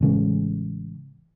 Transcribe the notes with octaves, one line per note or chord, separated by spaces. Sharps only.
A1 C#3 G#3